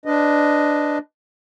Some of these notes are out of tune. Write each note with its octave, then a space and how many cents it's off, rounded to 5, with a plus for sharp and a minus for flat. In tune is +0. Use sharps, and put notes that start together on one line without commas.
D4 +0 B4 +25 D#5 +0